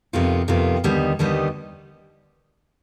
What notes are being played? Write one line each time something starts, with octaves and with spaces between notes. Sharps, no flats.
F2 C3 D#3 B3 F4
F2 C3 D#3 B3 F4
D#2 D3 G3 B3 D#4
D#2 D3 G3 B3 D#4